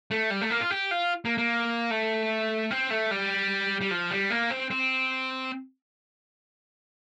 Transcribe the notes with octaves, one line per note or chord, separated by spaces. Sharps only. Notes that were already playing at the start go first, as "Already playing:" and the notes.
A3
G3
A3
A#3
F4
G4
F4
A#3
A#3
A3
C4
A3
G3
G3
F3
G3
A#3
C4
C4